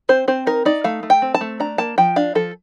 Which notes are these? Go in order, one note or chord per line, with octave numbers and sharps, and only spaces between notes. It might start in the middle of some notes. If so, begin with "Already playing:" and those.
C4 C5
C4 C5
D#4 A#4
D#4 D5
A3 F5
A3
G5
C4
A5
A3
D4 A#5
A#3 A5
F3 G5
D4 F5
F3 A4